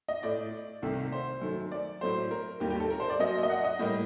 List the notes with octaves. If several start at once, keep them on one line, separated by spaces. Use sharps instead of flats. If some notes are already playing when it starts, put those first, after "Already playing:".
D#5
A2 A3 D5
C2 C3 D#3 A3
C5
F#2 D#3 A3
D5
A2 F#3 A3 C5
A#4
D#2 D#3 G3 A#3 G4
G4
A4
A#4
C5
D5
F#2 F#3 A#3 D#5
D#5
F#5
D#5
A2 G3 A#3